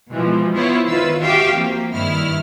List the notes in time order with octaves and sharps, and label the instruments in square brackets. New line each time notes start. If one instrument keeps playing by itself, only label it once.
[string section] B2 E3 F3 G#3
B3 E4 F4 C5 C#5
D#3 F4 B4 E6
F#4 G4 E5 F5 G5
F3 A#3 C4
G2 D#3 E4 F6